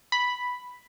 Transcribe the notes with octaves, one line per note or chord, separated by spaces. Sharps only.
B5